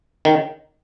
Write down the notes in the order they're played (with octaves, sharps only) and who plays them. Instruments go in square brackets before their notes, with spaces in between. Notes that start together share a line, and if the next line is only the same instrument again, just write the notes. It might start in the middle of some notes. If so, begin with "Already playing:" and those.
[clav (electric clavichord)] D#3